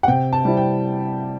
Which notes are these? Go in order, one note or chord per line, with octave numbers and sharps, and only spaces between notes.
F#5
C3 G5
A5
G3 C4 E4
G5